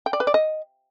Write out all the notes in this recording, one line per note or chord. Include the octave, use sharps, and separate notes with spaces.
G5
D5
B4
D5
D#5